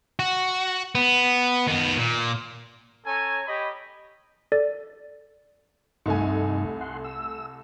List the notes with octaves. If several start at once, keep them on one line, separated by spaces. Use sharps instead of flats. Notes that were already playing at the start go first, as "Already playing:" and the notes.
F#4
B3
D#3 B3
A#2
C#4 A4 C#5 G#5 A#5
G4 C#5 D#5 B5
A4 D5 A6
C2 G2 A3 D#4 G#5
F#5 C6
E6